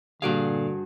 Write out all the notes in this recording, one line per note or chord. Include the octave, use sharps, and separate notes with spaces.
G2 A#2 D3 F#4 G#4 D5 F5